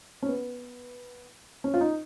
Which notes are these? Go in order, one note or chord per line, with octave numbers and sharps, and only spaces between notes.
C#4
B3
C#4
F4
D#4